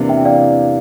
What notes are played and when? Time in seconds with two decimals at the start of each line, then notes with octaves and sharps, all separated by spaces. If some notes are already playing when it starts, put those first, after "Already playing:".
Already playing: E2 C3 E3 A#3 D4
0.09 E5 G5
0.25 D5 F5